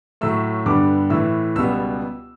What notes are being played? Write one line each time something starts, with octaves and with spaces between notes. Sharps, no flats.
A2 F#3 A3 E6
G2 D3 G3 B3 D6
A2 E3 A3 E6
C#2 B2 G3 B3 E6